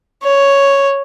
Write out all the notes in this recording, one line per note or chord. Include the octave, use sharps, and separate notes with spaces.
C#5